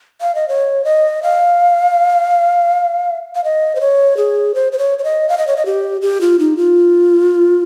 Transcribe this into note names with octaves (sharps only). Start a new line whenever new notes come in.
F5
D#5
C#5
D#5
F5
F5
D#5
C5
C#5
G#4
C5
C5
C#5
C#5
D#5
F5
D#5
C#5
D#5
G4
G4
F4
D#4
F4